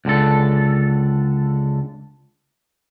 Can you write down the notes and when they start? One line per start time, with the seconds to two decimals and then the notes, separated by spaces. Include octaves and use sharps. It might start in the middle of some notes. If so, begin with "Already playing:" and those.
0.05 C#2 D3 A4